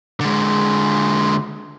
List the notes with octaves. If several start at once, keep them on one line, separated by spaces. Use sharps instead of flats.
D3 G#3